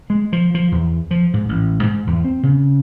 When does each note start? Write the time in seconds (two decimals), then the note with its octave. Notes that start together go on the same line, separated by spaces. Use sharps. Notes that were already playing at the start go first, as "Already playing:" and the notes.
0.10 G#3
0.33 F3
0.55 F3
0.72 E2
1.11 F3
1.34 G#2
1.49 A1
1.83 G#2
2.07 E2
2.25 C4
2.43 C#3